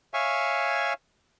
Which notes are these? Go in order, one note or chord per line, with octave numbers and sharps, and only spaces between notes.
C#5 E5 F5 G#5 C#6